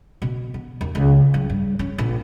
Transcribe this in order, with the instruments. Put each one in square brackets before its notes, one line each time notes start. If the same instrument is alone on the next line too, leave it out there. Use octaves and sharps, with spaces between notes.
[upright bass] B2
B3
D#2
C#2
F#3
G2
C#4
A#1